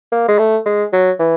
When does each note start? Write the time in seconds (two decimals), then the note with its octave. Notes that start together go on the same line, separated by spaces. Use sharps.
0.12 A#3
0.28 G#3
0.39 A3
0.66 G#3
0.93 F#3
1.19 E3